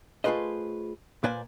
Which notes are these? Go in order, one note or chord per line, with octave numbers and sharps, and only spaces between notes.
A3 F4 G#4 B4 C5 D#5
A#2 A#3 B4 C5 D5 G#5